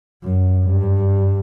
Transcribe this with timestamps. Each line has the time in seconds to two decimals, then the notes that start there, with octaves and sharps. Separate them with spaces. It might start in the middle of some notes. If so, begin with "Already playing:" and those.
0.24 F#2
0.64 G2